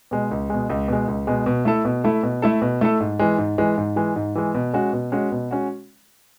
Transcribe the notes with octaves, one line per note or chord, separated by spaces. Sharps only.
B2 G#3
C#2
B2 G#3
C#2
B2 G#3
C#2
B2 G#3
B2
A3 E4 A4
B2
A3 E4 A4
B2
A3 E4 A4
B2
A3 E4 A4
G#2
E3 G#3
G#2
E3 G#3
G#2
E3 G#3
G#2
E3 G#3
B2
G#3 C#4 F#4
B2
G#3 C#4 F#4
B2
G#3 C#4 F#4